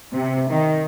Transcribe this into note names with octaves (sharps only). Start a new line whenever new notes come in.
C3
D#3